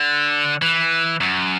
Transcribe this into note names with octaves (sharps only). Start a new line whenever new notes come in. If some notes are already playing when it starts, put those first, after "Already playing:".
Already playing: D3
E3
F#2